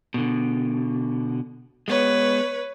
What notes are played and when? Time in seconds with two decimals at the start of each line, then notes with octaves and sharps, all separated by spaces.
0.14 B2 D3
1.88 G#3 B3 B4 C#5